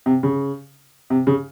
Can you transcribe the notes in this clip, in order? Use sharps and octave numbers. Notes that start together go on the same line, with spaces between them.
C3
C#3
C3
C#3